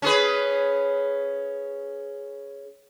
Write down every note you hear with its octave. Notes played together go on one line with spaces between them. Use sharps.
C#4 G#4 B4